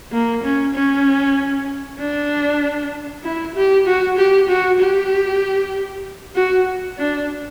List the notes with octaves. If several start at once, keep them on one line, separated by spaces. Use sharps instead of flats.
A#3
C#4
C#4
D4
E4
G4
F#4
G4
F#4
G4
F#4
D4